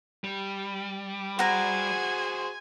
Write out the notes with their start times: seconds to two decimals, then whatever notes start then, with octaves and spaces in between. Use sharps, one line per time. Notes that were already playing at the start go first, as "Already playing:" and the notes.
0.24 G3
1.39 F#4 G#4 C5 F#5 G#5 A#5